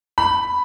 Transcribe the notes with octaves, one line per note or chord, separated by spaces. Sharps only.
B5